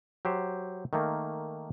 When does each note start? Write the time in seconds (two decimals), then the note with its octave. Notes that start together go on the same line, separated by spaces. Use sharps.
0.25 F#3 G4 C5
0.93 D#3 A3 A#3